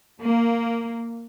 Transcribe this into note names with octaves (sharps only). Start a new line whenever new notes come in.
A#3